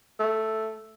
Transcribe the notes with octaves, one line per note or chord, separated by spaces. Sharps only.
A3